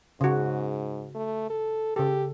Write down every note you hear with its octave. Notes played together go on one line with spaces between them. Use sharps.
G#2 C#3 F#4
A3
A4
C#3 G4 A4